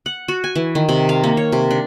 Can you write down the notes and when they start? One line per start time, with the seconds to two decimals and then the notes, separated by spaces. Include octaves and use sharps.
0.06 F#5
0.28 F#4
0.44 G#5
0.55 E3
0.75 D#3
0.89 C3
1.09 F5
1.24 A#3
1.37 C#5
1.52 C3
1.71 D4